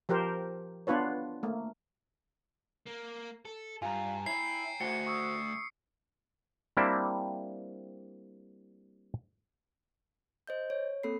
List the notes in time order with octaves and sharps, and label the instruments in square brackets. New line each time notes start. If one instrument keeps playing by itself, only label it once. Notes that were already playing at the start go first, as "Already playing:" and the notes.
[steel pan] F3 G4 A#4 C5
B3 D4 F4 B4 C#5
A3 A#3
[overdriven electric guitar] A#3
A4
[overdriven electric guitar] G2 [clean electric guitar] F4 [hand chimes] G#5 A#5
[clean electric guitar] E4 [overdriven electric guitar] C#5 G5 [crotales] C7
[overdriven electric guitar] A3 D4 [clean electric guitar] F#4 C5 G5 [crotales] C#7
[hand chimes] C#6 D#6 E6
[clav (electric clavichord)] G3 A#3 C4 D4 E4
[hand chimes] C5 D#5 G6
C#5
A#3 C4 A4 B5 C7